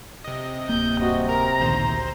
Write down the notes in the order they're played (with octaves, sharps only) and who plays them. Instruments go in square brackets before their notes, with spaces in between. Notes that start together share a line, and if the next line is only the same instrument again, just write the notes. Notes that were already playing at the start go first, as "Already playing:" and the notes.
[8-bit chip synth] C3 D#5
[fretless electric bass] D1 A#3 [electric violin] G6
[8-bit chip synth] G2 [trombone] C3 [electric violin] F#4 D#5
[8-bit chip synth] A#4 [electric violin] A#5
[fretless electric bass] A1 A#2 D#3 [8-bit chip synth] D2 C5